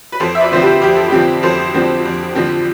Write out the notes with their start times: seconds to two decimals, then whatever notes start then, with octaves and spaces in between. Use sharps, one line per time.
0.12 B4
0.20 F2 A4 C5
0.35 E5
0.41 B4 D5
0.52 D3 F3 C4 C5
0.62 G4 B4
0.82 F2 G4
0.96 A4
1.10 D3 F3 C4 G4
1.43 F2 A4 C5
1.74 D3 F3 C4
2.06 F2
2.35 D3 F3 C4